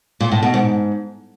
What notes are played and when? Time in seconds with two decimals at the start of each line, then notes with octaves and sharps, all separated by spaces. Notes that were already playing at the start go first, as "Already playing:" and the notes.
0.20 A#2
0.32 A2
0.43 B2
0.54 G#2